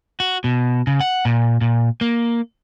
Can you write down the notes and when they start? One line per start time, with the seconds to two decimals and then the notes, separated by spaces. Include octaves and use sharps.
0.20 F#4
0.44 B2
0.87 C#3
1.01 F#5
1.25 A#2
1.61 A#2
2.01 A#3